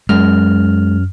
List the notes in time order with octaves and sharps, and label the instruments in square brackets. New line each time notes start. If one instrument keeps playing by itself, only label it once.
[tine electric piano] F#2 F6 [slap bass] G#3